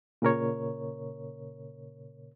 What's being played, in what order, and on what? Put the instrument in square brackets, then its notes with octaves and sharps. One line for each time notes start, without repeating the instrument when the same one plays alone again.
[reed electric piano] A#2 C#3 A#4 C#5